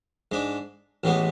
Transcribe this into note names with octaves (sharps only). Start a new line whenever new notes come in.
G#2 G#3 D4
A1 A2 E3 G#3 B3